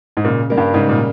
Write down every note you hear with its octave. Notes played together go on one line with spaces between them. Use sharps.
G#2
A#2 C#3
G3 A#3
G2
G#2 C#3
A#2